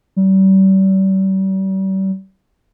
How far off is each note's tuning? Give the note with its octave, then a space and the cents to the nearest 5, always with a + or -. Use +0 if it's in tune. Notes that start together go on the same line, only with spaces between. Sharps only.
G3 -40